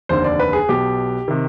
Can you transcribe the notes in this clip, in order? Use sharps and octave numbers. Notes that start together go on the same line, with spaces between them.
F1 D#2 D3 C5
D5
B4
G#4
B1 B2 G4
C3 D#3